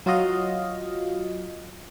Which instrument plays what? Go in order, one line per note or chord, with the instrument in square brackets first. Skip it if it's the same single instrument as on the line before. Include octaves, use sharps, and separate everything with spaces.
[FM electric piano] F#3 F4 F#4 D#5 F5